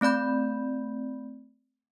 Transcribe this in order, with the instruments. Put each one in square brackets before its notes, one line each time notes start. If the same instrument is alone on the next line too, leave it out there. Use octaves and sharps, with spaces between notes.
[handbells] A3 C4 D5 B5 G6